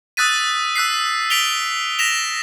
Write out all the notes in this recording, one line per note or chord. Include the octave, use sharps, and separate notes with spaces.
D#6 E6 F#6 A6 B6 D#7
E6 F#6 B6 C7
B6 D7 F7 G7
A#6 B6 E7 F7